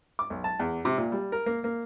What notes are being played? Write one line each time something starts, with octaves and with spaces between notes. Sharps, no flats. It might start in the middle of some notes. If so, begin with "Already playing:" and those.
D6
B1
A5
E2
C3
A#2
G3
A#4
A#3
A#3